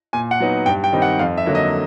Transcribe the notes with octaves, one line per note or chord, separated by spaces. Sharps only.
A#2 G#5
F#5
F#3 B3 D#4
G2 G5
G5
D#3 G3 C4 D#4
F#5
F2 F5
E5
D3 F#3 A#3
D#5